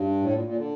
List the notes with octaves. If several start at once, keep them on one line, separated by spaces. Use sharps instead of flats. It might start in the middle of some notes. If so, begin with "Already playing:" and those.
Already playing: G2
A2
A#2
A#2
D3